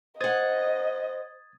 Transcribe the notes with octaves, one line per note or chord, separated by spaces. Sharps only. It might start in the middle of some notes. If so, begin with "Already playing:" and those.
C5 D#5 F#5 D#6 G#6 A6